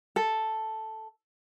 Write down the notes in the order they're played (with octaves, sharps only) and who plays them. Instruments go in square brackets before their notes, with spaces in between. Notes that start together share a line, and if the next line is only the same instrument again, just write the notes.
[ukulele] A4